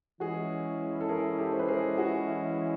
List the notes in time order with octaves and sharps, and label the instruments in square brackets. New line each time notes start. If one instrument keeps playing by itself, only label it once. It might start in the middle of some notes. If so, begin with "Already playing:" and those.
[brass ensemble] E3 G#3 C#4 E4 [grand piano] F#4 G#4
[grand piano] A4
G#4 A#4
G4 A4
C5
B4
G#4 A#4
F#4 G#4